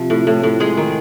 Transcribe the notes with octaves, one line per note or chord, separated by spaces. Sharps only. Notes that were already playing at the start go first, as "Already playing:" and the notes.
Already playing: C3 F3
A2
A2
A2
G#3 G#4
D#3